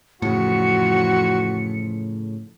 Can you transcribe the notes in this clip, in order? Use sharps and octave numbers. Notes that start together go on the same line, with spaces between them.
F2 A2 C#3 E3 F#4 C#7